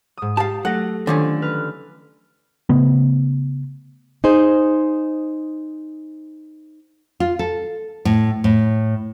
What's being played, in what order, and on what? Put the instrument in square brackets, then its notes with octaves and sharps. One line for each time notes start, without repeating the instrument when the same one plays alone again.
[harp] G#2 D#6
[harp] G4 [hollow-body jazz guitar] F5 A5
[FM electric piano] F#3 A3 [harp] A4 A#6 [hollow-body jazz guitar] F#5
[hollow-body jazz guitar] D3 F3 C#4 [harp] D#3
[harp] B4 F6
[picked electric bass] C#3 A3 B3
[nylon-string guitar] D#4 G#4 C5
F4
A4
A2
A2